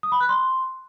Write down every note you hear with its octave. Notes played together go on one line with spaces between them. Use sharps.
D#6
B5
F#6
C6